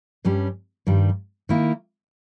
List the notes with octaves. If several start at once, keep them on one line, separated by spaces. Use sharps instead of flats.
G2 G3 C#4
G2 D#3 G3
D#3 A#3 E4